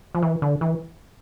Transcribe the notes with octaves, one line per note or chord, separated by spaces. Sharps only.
F3
E3
D3
E3